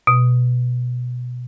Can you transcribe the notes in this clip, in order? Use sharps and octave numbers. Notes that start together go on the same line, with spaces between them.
B2